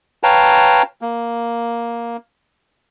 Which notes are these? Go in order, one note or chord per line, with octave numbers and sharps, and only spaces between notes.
B4 C#5 F5 G5 A5 A#5
A#3